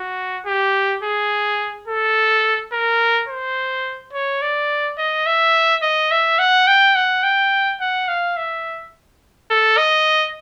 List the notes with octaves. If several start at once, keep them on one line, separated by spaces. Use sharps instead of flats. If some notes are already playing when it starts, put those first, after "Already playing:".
Already playing: F#4
G4
G#4
A4
A#4
C5
C#5
D5
D#5
E5
D#5
E5
F#5
G5
F#5
G5
F#5
F5
E5
A4
D#5